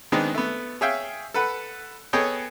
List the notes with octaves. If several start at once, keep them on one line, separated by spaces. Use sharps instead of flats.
D#3 G#3 B3 C4 D4 D#4
A3 B3
G#4 C#5 E5 F5 G5
A4 B4 F#5 B5
B3 G#4 A4 C#5 D#5 G5